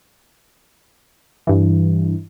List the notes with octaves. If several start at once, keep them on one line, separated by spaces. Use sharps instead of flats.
G2 E3